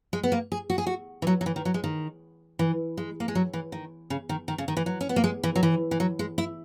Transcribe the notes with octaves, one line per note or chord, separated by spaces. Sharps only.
G#3
B3
A#3
G#4
F#4
G#4
F#4
E3
F#3
F#3
E3
D#3
F#3
G#3
D#3
E3
G#3
A#3
G#3
F#3
E3
D#3
C#3
D#3
D#3
C#3
D#3
E3
F#3
C#4
B3
A#3
G#3
E3
F#3
E3
E3
F#3
G#3
E4